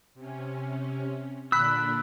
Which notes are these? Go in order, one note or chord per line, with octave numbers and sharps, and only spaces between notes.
C3 C#4
A#2 D3 D4 B5 E6 F#6 B6